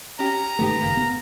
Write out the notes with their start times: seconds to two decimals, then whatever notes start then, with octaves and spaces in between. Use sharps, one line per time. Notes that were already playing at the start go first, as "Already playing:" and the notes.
0.19 C#4 G4 A#5
0.59 G#2 D#3 A3 B3 G4
0.82 F#1 A#3
0.97 B3